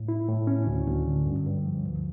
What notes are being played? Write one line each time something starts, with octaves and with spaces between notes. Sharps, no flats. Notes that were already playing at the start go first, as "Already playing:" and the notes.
Already playing: A2
E4
A2
C#4
D2
D2
D3
G2
G2
F3
D2